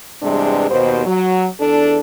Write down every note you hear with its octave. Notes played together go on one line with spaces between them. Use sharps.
E2 G2 C3 G3 G#3 D4
D#2 B2 C5
F#3
E2 D4 A4